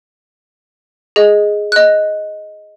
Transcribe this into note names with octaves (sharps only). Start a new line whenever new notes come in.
G#4 D#5
D#5 F#6